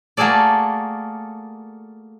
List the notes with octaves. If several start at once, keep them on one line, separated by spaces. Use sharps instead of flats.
A3 A#3 F#4 G#4 A4 D5